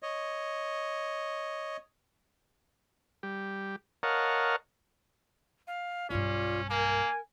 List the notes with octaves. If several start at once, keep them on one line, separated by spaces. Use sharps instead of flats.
C#5 D#5
G3 G4
A#4 C#5 D#5 F5 F#5 A5
F5
B1 G2 C#4 F4 D5
A#3 A#4 G#5